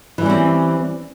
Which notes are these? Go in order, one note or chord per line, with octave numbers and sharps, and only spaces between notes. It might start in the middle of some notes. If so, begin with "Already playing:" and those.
E3 G3 C4 C#4